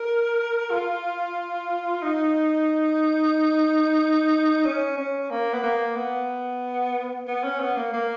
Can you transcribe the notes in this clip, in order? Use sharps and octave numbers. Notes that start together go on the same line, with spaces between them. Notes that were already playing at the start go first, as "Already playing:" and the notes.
Already playing: A#4
F4
D#4
C#4
C#4
A#3
B3
A#3
B3
B3
C#4
B3
A#3
A#3